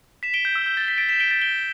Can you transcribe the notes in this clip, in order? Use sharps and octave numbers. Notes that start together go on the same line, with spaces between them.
B6 E7
D7 G7
G6
E6
G6
A6
B6
A6 D7
B6 E7
D7 G7
A6 D7
D7 G7